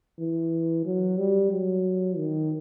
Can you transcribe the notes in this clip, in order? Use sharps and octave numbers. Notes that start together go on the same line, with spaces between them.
E3
F#3
G3
F#3
D#3